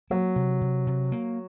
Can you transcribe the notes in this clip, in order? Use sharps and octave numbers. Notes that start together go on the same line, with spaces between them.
F#3 A#3
C3
C3
C3
A#3